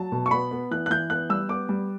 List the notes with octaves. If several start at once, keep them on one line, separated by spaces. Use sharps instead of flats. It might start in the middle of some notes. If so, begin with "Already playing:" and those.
Already playing: F#3 A5
B2
C#6
B3 B5
B3
E3 F#6
F#6
E3 G6
B3 F#6
G3 E6
B3 D6
G3